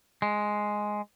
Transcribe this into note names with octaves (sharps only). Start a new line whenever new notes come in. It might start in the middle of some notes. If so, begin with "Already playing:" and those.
G#3